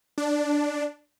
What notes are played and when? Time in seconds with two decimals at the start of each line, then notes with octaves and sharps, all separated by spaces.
0.18 D4